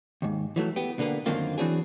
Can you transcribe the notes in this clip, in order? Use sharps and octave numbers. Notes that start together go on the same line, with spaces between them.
D#2 G#2
E3 F#3 A3
B3 G4
B2 D3 A#3 B3
F#2 D3 D#3 A#3 C4 F4
E3 F#3 C4 D4 G#4